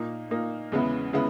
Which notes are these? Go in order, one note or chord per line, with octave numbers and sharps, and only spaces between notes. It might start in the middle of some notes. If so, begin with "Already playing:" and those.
Already playing: A#2 A#3 D#4
A#2 A#3 D#4
E2 C#3 G#3 B3 E4
C#3 G#3 B3 E4